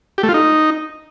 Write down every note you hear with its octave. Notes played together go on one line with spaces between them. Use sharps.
G4
A3
F4
D#4